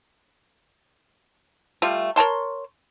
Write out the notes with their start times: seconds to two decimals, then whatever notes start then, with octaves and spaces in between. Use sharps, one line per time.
1.82 G3 A3 F4
2.16 A#4 C#5 A5 C6